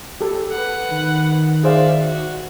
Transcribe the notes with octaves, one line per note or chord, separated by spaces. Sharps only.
G4 A4
B4 F#5
D#3
G#4 C5 D5 E5 F5
F#4